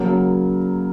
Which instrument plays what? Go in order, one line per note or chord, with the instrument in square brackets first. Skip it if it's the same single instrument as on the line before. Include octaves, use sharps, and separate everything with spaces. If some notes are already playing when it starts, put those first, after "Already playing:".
Already playing: [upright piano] C#3 F#3 A#3